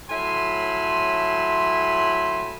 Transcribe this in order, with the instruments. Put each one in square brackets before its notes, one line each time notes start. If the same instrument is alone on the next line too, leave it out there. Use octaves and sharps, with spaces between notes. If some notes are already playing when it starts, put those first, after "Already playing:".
[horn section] A2 F#3 E5 G#5 B5 C6